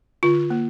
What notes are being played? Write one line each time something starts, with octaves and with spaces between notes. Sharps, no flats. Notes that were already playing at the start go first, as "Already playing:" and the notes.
D3 F4
A#3